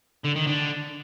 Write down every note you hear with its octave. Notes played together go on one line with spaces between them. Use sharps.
D3
D#3
D3